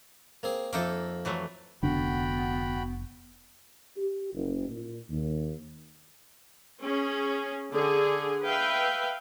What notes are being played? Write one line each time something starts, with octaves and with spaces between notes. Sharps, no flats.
A#3 C4 G#4
F2 A#3 D#4 A4 E5 D6
E3 F#3 A3
F1 D2 B3 D4 F#4 G5 B5
G4
F#1
A#2
D#2
C#4 G#4
D3 G#4
B4 E5 F5 G5